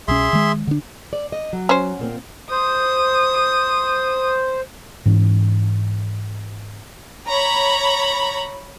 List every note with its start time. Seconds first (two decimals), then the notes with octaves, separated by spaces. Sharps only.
0.08 C2 B2 C#4 G#4 E5 C6
0.33 D#3 G#3
0.67 D3 D4
1.13 D5
1.32 D#5
1.53 F#3
1.69 C#4 C5
1.99 A#2 A#3 C4
2.51 C5 D#6
5.06 G#2 E3 C#4
7.28 C#5 A#5 B5